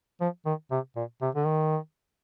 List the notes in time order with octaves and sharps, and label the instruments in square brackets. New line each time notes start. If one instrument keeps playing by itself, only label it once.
[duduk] F3
D#3
C3
A#2
C3
D3
D#3